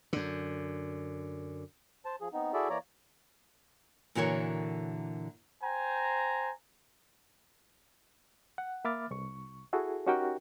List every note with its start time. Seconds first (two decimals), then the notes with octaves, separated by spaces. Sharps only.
0.13 F#2 D3
2.05 C5 A5
2.21 F3 G#4
2.33 B3 C4 D#4
2.54 E4 F#4 G#4 A4 D5 E5
2.70 E3 A#3 C#5 D5 A#5
4.15 A#2 D3 E3 F#4 A#4 C#5
5.64 C5 G5 G#5 A#5
8.58 F#5
8.85 A#3 E5 B5 D6 F6 A6
9.11 C2 C#6
9.73 E4 F#4 G#4 A4
10.07 C#4 D#4 F#4 G4 A#4 G5